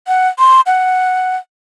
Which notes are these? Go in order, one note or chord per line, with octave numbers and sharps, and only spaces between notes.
F#5
C6
F#5